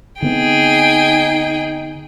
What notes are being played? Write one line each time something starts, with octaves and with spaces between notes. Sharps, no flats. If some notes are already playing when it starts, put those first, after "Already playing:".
D3 B3 C4 D#4 G#4 G5